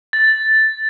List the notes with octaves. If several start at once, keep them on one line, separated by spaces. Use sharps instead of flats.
A6